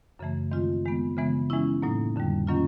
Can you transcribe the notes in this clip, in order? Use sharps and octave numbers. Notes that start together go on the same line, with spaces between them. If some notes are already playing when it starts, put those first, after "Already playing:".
F#2 C#3 E3 A3
D#3 G#3 C4 F4
D#3 G#3 B3
C#3 E3 G#3 B3
E3 G#3 C#4 E4
A2 F#3 A#3 D#4
F2 D3 G3
D#3 F#3 A#3 C#4 F4